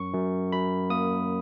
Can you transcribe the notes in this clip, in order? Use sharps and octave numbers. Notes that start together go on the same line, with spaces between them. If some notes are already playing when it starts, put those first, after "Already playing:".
Already playing: F#2 C#6
F#2
F#2 B5
A#3 D#6